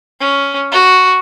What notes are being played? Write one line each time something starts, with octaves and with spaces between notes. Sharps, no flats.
C#4
F#4